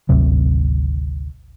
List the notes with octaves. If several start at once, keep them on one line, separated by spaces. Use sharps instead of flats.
G#1 D2 C3 F#3